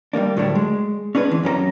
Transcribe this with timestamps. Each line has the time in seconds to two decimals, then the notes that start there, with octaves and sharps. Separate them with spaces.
0.13 G3 G#3 A#3 D4
0.37 D2 A2 F#3 G3 A3 D4
0.55 G#3
1.15 C#4 D4 G#4 B4
1.31 E3 C4
1.43 F#2 C#4 A4 A#5